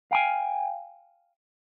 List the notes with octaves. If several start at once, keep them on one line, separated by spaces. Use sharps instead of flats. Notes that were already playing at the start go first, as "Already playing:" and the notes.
F5 G5 G#5